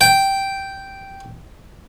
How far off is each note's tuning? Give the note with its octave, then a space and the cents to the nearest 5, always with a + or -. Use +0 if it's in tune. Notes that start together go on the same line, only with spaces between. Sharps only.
G5 -5